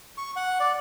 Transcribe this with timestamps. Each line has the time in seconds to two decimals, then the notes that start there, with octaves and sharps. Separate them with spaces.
0.18 C#6
0.36 F#5
0.60 D5